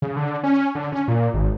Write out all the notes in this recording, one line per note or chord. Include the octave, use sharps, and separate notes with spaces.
C#3
D3
C#4
D3
C#4
A#2
G#1